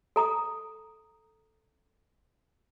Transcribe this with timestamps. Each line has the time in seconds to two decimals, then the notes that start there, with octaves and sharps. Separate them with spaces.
0.16 A4 A#5 D#6